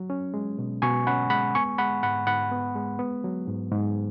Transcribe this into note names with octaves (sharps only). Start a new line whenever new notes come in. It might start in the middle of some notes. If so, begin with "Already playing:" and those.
Already playing: F#3
C#4
G#3
B2
B2 G#5 C#6
C#4 F#5 B5
G#3 F#5 B5
B3 G#5 C#6
G#3 F#5 B5
G#2 F#5 B5
G#2 F#5 B5
B3
G#3
B3
F#3
G#2
G#2